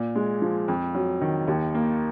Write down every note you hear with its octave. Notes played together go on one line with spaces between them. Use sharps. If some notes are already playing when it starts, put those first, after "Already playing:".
Already playing: A#2
G#3
F3
F2
F#3
D#3
D#2
A#3